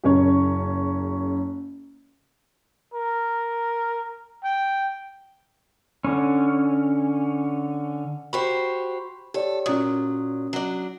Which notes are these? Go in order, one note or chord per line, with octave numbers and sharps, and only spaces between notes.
F#1 F#2 C#3 C#5 C#6
A#4
G5
D3 C#4
F#4 G4 C5 B5 C#6
G4 A4 C#5 D5
A#2 F#3 C#4 D#6
F#3 D4